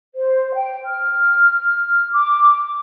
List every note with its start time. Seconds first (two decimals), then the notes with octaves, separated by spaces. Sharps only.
0.14 C5
0.54 G5
0.85 F6
2.12 D6